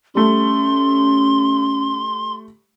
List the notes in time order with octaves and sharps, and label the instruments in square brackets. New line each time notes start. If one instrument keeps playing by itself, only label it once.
[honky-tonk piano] G3 A3 [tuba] C#4 [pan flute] C6